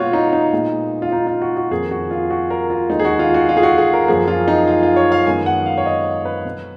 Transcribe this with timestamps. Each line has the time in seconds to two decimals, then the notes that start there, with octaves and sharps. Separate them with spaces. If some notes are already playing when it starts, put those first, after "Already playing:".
Already playing: A#2 G#3 B3 F4 F#4 C#5
0.13 D#4
0.33 D#4
0.53 A#2 G#3 B3
1.02 F4
1.12 D#4
1.27 F4
1.42 F#4
1.57 F#4
1.71 F2 D#3 A#3 G#4
1.91 F#4
2.11 F4
2.30 F#4
2.50 A#4
2.70 F4
2.89 D#2 D#3 G#3 D#4
2.99 G#4
3.05 F#4
3.19 F4
3.34 F#4
3.49 F4
3.57 G#4
3.63 F#4
3.78 G#4
3.93 A#4
4.08 F#2 F3 A#3 G#4
4.28 F4
4.48 D#4
4.67 F4
4.83 F4
4.96 C#5
5.12 F5
5.26 F#2 D#3 G#3 B3 G#5
5.46 F#5
5.66 F5
5.78 C#5
5.86 D#5
6.25 B4
6.45 B2 F#3 B3